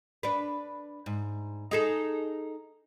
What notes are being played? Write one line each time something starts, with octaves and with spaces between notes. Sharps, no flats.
D4 B4
G#2
D#4 G#4 A4